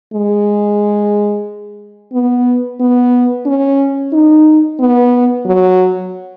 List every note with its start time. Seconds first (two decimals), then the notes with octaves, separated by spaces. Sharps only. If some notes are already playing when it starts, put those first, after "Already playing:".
0.13 G#3
2.13 B3
2.80 B3
3.46 C#4
4.13 D#4
4.80 B3
5.46 F#3